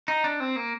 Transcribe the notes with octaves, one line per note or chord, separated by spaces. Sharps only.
D#4
D4
C4
A#3